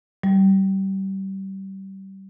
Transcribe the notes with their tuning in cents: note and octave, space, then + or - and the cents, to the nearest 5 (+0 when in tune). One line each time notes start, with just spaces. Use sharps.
G3 -25